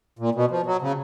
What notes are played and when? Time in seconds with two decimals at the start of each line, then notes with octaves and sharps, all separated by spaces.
0.19 A#2
0.35 B2
0.51 F3
0.66 F#3
0.81 C#3